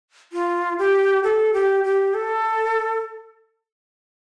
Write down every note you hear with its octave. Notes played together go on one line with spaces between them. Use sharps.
F4
G4
A4
G4
G4
A4